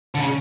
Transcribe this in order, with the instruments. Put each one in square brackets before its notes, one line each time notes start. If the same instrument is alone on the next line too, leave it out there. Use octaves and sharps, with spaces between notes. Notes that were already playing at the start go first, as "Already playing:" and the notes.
[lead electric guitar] D3
C#3